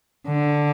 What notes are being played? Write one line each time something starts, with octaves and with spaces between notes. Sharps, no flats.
D3